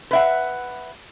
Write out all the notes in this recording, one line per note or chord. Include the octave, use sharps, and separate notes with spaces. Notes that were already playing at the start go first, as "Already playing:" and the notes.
B4 E5 F#5